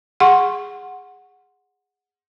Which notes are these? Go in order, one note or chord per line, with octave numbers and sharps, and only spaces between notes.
G#4 F#5 C6 C#6